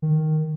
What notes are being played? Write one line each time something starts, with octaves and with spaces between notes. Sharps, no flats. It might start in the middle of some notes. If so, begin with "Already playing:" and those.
D#3